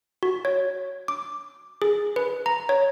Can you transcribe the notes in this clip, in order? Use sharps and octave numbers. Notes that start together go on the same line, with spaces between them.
F#4
C#5
D6
G#4
B4
A#5
C#5